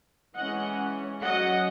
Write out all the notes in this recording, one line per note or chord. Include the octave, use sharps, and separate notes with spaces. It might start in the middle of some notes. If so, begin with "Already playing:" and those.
E3 G#3 C#4 D#5 F#5
F#3 C#4 D#5 F#5